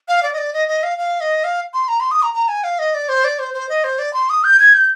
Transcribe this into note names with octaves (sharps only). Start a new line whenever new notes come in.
F5
D5
D#5
D5
D#5
D#5
F5
F5
D#5
F5
C6
A#5
C6
D#6
A#5
A#5
G#5
F5
D#5
D5
C5
D5
C5
C5
D#5
C5
D5
C6
D#6
G6
G#6
G6